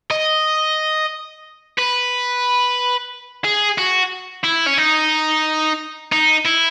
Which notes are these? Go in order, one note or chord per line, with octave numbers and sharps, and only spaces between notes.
D#5
B4
G#4
F#4
E4
C#4
D#4
D#4
E4